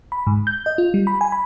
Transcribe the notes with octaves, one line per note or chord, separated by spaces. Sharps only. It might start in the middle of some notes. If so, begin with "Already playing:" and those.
B5
G#2
G6
D#5
F4
G3
B5
G#5
B5